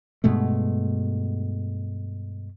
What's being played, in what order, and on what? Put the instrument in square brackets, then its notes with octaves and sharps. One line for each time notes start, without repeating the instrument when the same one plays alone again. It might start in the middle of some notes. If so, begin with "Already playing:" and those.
[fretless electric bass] G2 B2 G#3 A3